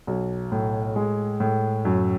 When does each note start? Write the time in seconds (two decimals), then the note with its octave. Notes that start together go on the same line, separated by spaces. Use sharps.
0.07 B1
0.52 A2
0.96 G#3
1.40 A2
1.85 F#2